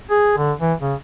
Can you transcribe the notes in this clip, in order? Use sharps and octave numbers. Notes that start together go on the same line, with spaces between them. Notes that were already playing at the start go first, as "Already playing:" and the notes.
G#4
D3
E3
C#3